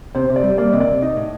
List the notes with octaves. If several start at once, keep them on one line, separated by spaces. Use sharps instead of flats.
C3 C5
C3
D5
G3
A#3 D5
C3 D#5
D5
C3
D#4 D#5
A2